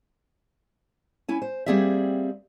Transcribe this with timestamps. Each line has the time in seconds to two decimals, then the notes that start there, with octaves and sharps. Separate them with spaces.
1.29 C#4 E4 G#5
1.42 C5
1.66 G3 A#3 C4 G#4 D5 E5